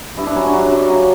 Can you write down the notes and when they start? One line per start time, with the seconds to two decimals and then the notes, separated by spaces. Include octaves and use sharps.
0.17 G2 E4
0.27 D4
0.36 F#3 C#4
0.46 D4
0.53 F#3
0.71 F#2
0.90 C#3